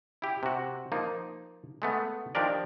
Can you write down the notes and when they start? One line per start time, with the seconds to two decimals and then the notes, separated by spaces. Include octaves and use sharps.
0.22 E4 G4
0.43 C3 F#4
0.92 F3 A#3 D#4
1.82 G#3 A3 B3
2.35 D#3 F3 D4 G4 A#4 D5